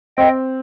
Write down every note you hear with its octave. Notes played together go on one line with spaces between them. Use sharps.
C4 D#5 G5